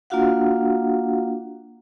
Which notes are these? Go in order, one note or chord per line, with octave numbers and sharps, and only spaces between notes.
A#3 D4 F4 F#4 F5 F#5